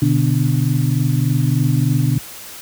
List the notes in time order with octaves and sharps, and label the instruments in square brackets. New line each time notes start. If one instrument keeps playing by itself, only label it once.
[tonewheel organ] B2 D3